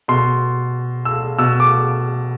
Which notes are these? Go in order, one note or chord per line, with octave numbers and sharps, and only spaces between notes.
B2 C6
E6
B2 E6
D6